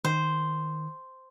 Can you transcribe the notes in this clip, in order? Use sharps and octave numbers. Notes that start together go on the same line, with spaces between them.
D#3 C5